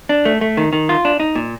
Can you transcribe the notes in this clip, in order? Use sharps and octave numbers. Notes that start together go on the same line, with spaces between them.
D4
A3
A3
D#3
D#3
F4
D4
D#4
A#2